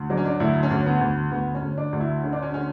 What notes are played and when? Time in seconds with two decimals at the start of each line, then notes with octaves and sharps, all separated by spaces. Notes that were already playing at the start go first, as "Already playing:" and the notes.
Already playing: D2
0.10 F#3 D4
0.17 C#4
0.25 D4
0.40 D2 E4
0.63 C#4
0.71 D2
0.86 B3
1.01 D2
1.31 D2 B3
1.55 C#4
1.62 D2
1.78 D4
1.93 D2
2.00 E4
2.23 D3 C#4
2.33 D4
2.42 C#4
2.54 D3 C#4